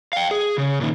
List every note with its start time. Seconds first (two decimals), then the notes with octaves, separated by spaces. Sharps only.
0.13 F5 G5
0.31 G#4
0.58 C#3
0.81 A#2 D#3